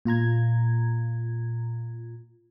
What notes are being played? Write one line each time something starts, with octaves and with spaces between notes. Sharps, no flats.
A#2 F4 A#5 G#6